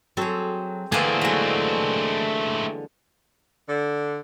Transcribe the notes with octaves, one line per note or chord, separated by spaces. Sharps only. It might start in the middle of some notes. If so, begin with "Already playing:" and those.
F#3 C4 G#4 A4
D3 E3 A3 A#3 C4 G#4
F#3 G#3
D3